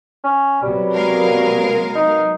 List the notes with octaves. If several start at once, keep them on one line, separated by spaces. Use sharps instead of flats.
C#4
C3 F#3 G3 B3
G#3 A#4 F5
D#4